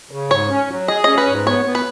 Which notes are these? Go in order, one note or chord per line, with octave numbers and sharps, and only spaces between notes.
C#3
G#2 C#5
C#4
F#3
G#4 D#5
C#4 D#5
B4
G#2
B3 C#5
B3
B4